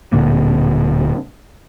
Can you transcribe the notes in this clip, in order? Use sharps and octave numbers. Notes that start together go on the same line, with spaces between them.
D1 A#2 D3 A#3